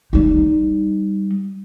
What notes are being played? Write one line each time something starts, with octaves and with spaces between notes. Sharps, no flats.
G3 D#4